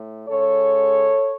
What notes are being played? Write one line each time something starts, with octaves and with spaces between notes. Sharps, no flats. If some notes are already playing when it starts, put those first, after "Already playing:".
Already playing: A2
C#3 G#3 A4 C#5